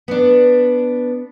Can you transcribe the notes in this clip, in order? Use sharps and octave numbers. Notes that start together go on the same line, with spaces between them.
B3 D4